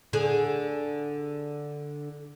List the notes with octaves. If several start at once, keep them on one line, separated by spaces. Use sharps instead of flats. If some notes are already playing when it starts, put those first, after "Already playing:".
D3 G#4